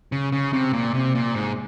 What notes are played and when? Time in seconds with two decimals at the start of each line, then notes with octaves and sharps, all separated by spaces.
0.12 C#3
0.32 C#3
0.53 C3
0.73 A#2
0.94 C3
1.15 A#2
1.35 G#2